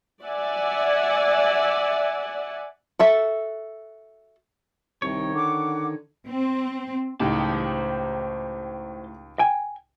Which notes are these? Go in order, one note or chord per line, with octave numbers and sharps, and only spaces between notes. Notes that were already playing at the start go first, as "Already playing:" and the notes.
D5 E5 F#5 G#5
F#4 A4 E5
C2 D#3 C#5
D3 F#5 D6
C4
C#2 A2 D#4 G4 C5 A5
G5 G#5